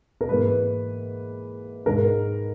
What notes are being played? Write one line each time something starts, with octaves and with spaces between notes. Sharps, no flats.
A#4
G#2 E3 A#3 B4
G#2 D#3 G#3 D#4 A#4